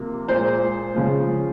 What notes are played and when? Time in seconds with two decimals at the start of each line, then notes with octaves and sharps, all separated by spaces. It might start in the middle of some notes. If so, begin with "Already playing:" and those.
Already playing: C3 F3 A#3
0.28 A#2 G#3 C5
0.95 C#3 F3 G#3